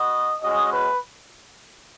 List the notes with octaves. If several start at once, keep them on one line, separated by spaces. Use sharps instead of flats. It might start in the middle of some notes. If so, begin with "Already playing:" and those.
Already playing: B3 F#4 D#5
G#3 C#4 F#4 D#5
B4